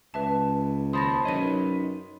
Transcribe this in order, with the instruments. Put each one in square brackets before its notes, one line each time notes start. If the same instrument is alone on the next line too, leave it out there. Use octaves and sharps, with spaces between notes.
[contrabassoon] C#2 [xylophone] B4 E5 A5
[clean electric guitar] D#2 C5 A5 [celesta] B5 C6 [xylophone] D#6 A6 A#6
[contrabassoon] F#2 [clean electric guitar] D#4 B4 D#5 [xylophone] C#5 D#7